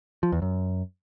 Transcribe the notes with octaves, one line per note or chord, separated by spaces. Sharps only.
F3
E2
F#2